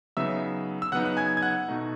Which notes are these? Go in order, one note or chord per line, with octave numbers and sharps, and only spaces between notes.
C#3 F#3 B3 D#4 E5 E6
E6
C#3 F#3 B3 D#4 F#5 F#6
F#6
G#5 G#6
G#6
F#5 F#6
B2 A3 D#4